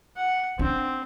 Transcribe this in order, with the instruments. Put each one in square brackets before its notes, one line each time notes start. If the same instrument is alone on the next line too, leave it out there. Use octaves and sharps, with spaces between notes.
[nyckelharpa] F#5
[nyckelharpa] C4 [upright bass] D4